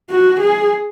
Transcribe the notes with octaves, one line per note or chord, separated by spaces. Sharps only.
F#4
G#4